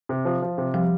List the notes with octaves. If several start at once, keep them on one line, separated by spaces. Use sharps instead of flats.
C3
F3
F3
C3
F3 G3